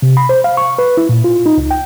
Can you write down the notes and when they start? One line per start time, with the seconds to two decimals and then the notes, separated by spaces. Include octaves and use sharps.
0.02 C3
0.17 B5
0.29 C5
0.44 F5
0.57 C#6
0.79 B4
0.97 E4
1.09 A#2
1.24 F4
1.46 D#4
1.58 C#2
1.71 G5